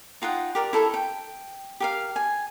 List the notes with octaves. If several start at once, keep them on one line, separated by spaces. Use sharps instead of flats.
D#4 F4 F#5 G5
G4 A#4 D5
E4 A4 A#4 C#5
G5
G4 A#4 F5
G#5